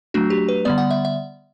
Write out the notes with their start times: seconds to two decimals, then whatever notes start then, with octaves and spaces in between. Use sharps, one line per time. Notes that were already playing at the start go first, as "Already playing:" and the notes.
0.14 F#3 A3 D4 F#4
0.30 G4
0.49 B4
0.65 D3 G3 B3 D5
0.78 F#5
0.91 E5
1.05 E5